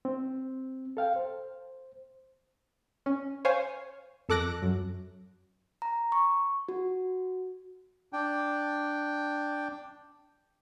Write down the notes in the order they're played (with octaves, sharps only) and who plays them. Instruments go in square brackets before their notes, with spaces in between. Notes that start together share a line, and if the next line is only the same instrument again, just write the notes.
[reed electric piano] C4
A4 F5 G5
C5
[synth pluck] C#4
C5 C#5 F5 G#5
F2 A4 D6 F#6 A#6 D7
F#2
[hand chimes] A#5
C#6
F#4
[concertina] D4 G5